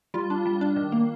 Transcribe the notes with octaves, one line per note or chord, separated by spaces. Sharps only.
G3 F4
D4
G3
D4
D#3
A#3